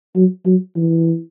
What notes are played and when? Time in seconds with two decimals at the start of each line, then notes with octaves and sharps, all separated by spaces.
0.15 F#3
0.46 F#3
0.77 E3